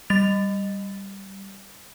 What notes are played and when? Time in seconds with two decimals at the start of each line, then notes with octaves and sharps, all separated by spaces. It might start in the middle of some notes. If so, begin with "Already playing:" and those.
0.10 G3 A6 F7